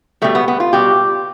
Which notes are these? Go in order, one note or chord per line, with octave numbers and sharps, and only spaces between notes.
B2 G3 A3
B3
B3
F4
B2 G3 G4